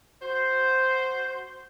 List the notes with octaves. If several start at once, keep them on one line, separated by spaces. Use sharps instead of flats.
F#4 C5